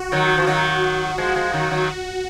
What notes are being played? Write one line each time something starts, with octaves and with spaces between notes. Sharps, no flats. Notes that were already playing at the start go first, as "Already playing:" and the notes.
Already playing: F#4
D#3 F#3
F3
D#3 F#3 F#4
F3 G#3
F3 G#3
D#3 F#3
D#3 F#3